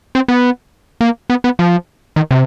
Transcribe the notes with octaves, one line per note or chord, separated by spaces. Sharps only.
C4
B3
A#3
B3
B3
F3
D#3
C3